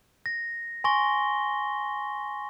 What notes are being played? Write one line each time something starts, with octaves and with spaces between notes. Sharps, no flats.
A#6
G#5 C6 C#6 A#6 G7